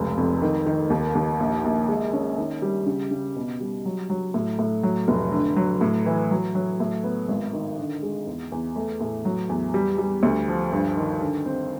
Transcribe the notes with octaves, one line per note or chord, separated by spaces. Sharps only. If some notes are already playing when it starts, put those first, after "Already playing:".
Already playing: F1 C#2
F2
D#3
D#3
D#2
D#2
A#1
A#1
G#3
C#4
D#3
G3
C#3
C#3
B2
G3
F#3
F#3
A2
A2
F#3
F1
D3
F#3
A2
E3
F#3
F#3
A2
B3
G#1
D#3
D3
G#3
E2
E2
A3
A2
F#3
E2
G3
G3
D2
F3
G2
D#3
D3
C4